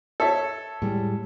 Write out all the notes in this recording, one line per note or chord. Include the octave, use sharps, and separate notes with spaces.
A4 C#5 E5
A2 G3 G#3